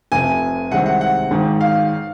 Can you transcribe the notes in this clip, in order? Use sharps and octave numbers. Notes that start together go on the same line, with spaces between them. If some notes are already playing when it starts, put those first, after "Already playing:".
F1 F2 C3 G#5
C2 C3 D#3 G#3 C4 F#5
F#5
F#5
G#1 G#2 D#3
F5